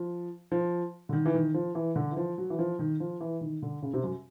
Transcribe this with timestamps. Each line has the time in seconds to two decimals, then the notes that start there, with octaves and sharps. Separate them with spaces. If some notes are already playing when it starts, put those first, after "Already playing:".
Already playing: F3
0.52 F3
1.09 D3
1.13 D#3
1.26 E3
1.34 D#3
1.54 F3
1.75 E3
1.96 D3
2.11 E3
2.17 F3
2.38 F#3
2.50 E3
2.59 F3
2.79 D#3
3.00 F3
3.20 E3
3.41 D#3
3.62 D3
3.83 C#3
3.94 C3
4.04 F#2